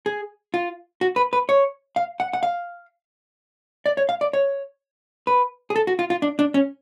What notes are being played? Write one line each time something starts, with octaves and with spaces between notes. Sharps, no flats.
G#4
F4
F#4
B4
B4
C#5
F5
F#5
F#5
F5
D5
C#5
F5
D5
C#5
B4
G#4
A4
F#4
F4
F4
D4
D4
C#4